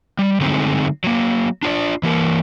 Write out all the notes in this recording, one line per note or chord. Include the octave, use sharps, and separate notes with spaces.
G3
D3 F#3 G#3 A3 C4 D#4
F#3 A#3
D4 F4 C#5 D5
E3 A#3 A#4